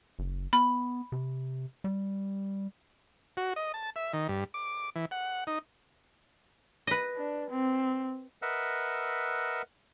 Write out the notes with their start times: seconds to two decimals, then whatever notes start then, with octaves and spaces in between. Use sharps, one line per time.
0.19 F#1
0.53 B3 B5
1.12 C3
1.84 G3
3.37 F#4
3.56 D#5
3.74 A5
3.96 E5
4.13 D#3
4.29 G2
4.54 D6
4.96 E3
5.11 F#5
5.47 D#4
6.87 B4 D#5
7.17 D4
7.50 C4
8.42 A#4 B4 D#5 E5 F#5 E6